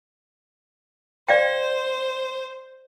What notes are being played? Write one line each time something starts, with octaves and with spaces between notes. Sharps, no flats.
C5 D5 F5 G5